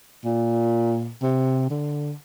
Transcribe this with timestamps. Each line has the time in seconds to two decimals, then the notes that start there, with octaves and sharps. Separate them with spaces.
0.24 A#2
1.22 C3
1.70 D3